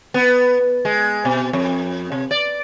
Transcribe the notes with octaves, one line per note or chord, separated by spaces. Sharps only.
B3
G#3
B2
F2
C3
D5